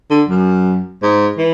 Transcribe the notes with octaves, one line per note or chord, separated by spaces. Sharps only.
D3
F#2
G#2
E3